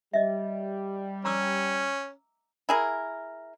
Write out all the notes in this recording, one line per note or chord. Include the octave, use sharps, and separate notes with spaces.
G3 D#5 E5
C#4 A#5 D6 E6
E4 G#4 A#4